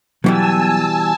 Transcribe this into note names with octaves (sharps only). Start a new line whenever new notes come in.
B2 E3 F#3 G3 B3 G#5 A5 E6